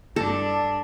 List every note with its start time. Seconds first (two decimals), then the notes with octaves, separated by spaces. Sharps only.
0.16 G2 D4 A4